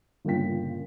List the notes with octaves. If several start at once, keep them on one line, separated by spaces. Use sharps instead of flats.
G1 A#2 C#3 G5 B6